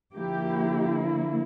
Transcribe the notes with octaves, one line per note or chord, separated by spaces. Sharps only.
D3 F3 A#3 E4 G4